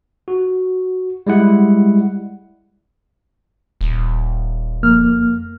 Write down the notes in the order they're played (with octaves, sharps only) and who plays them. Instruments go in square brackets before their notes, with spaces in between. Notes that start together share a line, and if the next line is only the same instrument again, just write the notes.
[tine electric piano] F#4
G3 G#3 E4 F#5
[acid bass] D#1
[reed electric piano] F2 A#3 F6